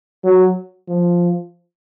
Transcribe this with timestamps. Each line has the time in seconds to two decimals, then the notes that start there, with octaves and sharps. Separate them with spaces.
0.24 F#3
0.88 F3